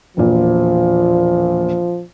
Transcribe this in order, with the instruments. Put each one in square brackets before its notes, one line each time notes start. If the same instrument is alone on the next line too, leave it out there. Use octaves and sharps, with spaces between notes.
[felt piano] E1 A#2 [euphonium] F3